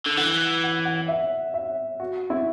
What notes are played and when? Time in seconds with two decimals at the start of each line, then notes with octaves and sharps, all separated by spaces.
0.06 D3
0.17 E3 F#5
0.64 F#5
0.85 F#5
1.08 E5
1.54 E5
2.00 F#4
2.30 E4